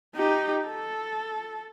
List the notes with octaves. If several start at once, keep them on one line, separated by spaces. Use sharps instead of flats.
D#4 G4
A4